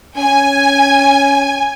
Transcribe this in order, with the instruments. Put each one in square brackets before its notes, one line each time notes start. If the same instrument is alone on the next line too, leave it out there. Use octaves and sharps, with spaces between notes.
[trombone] C#4 [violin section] G#5